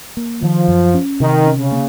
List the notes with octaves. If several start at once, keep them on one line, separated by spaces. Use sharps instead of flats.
A#3
D#3 F3
F#2
C#4
C3 D#3
C#4
C#3
A#3